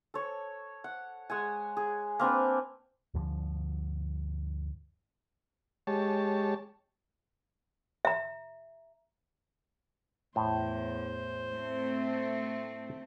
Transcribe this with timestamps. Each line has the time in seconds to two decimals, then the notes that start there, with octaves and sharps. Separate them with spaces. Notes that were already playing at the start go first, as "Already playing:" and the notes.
0.14 A4 C#5
0.84 F#5
1.30 G#3 F#5 G#5
1.77 G#4
2.19 A#3 C4 D4 B4
3.14 D2 G2 D3 F3
5.87 G#3 G4 C#5 A5
8.05 E5 A#5
10.36 E2 A2 C5
11.52 A3 C4